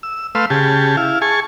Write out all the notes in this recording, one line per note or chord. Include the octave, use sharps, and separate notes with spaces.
E6
A3 B4 F5 C6 E6
C#3 G4 G#4 A5
E4 F5
G#4 G#5 A5 C#6